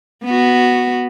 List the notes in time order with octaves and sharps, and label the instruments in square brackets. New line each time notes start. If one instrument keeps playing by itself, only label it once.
[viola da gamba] B3 F#4